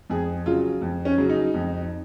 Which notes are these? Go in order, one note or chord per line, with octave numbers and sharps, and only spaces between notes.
F2 G#4
C#3 F#3 F4
F2
C#4
C#3 F#3
D#4
F2